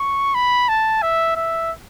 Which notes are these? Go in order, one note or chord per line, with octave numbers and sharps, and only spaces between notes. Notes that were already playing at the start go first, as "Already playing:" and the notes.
Already playing: C#6
B5
A5
E5
E5